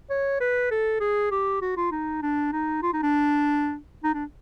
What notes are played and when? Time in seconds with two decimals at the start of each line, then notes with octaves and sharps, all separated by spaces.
0.10 C#5
0.40 B4
0.71 A4
1.00 G#4
1.31 G4
1.62 F#4
1.77 F4
1.91 D#4
2.22 D4
2.52 D#4
2.82 F4
2.93 D#4
3.03 D4
4.04 D#4
4.14 D4